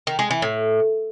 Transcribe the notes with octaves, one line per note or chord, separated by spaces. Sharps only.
D#3
G#3
E3
A2